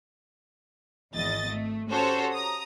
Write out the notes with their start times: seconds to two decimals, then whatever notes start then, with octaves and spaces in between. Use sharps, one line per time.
1.13 G#1 E2 D#5 A6
1.47 A3
1.90 C#4 F#4 G4 A4 C5 C#5
2.33 A#5 D#6